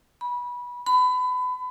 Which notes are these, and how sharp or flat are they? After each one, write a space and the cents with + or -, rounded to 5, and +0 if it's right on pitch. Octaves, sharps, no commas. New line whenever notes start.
B5 -20
B5 +30